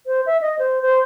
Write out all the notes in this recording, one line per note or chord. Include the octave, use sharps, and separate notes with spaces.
C5
E5
D#5
C5
C5